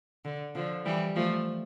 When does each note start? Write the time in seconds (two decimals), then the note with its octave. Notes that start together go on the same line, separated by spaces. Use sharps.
0.25 D3
0.55 D3 F3
0.86 E3 G3
1.15 F3 A3